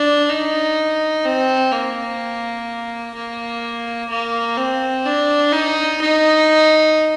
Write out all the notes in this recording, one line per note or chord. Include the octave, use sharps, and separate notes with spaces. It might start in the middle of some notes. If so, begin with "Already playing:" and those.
Already playing: D4
D#4
C4
A#3
A#3
A#3
C4
D4
D#4
D#4